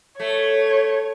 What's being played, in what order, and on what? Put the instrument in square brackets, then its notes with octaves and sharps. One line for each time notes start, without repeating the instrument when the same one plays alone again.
[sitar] A3 [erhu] C#5